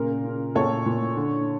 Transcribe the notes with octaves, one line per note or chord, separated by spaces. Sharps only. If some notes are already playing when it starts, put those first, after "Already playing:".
Already playing: A#2 C#3 A#4
C#3
A#2 A4 C#5
A#2
D3